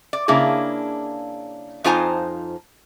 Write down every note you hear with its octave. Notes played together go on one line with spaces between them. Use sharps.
D5
C#3 A#3 D4 E4 G#4
F2 D#4 F4 C5 G#5 A#5